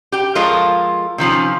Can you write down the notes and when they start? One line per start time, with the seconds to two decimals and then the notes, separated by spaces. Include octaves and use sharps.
0.12 G4 G5
0.35 F3 G#3 F4 A4 A#4 C#5
1.18 C3 D#3 F3 C#4